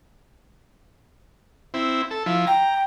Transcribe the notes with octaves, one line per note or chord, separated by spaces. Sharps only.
C4 E4
A4
F3 E4
G5 A#5